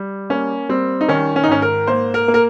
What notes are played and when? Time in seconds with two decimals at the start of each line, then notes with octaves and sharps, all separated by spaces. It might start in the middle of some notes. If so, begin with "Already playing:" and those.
Already playing: G3
0.30 A#3 C#4
0.69 G3 C4
1.01 D#4
1.08 D#3 C#4
1.36 C#4
1.44 D#4
1.48 G#2 C#4
1.62 A#4
1.87 A#3 C5
2.14 A#4
2.28 A#3
2.34 A#4